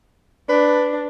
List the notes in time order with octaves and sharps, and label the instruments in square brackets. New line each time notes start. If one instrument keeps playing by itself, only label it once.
[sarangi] D4 [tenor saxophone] B4